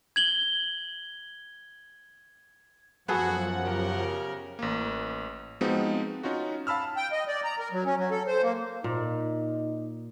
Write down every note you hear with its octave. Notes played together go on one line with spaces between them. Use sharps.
G#6 F#7 G7
F#2 F3 B3 F#4 G#4 A4 F#5
C#3 G4 A#4
A1 A#3
F3 G#3 B3 C4 D#4 F#4
C#4 D#4 F4 F#4
F5 A5 B5 E6 F6
G5
D#5
D5
A#5
A#4
F#3
C#4
F#3
A4
C5
A#3
A#2 D#4